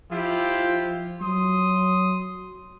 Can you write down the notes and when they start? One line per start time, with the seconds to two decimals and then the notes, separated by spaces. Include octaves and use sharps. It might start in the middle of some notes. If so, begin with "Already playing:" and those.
0.11 F3 E4 F4 G4
1.21 F#3 C6 D#6